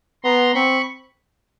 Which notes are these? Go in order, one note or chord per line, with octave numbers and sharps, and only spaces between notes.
B3 A#5 C6
C4 B5 C#6